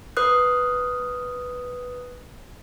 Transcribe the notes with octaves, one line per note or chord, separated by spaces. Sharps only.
B4 D#6 F#6